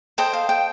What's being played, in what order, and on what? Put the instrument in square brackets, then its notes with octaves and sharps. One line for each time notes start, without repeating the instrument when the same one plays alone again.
[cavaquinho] A4 C5 D#5 G5
F5
G5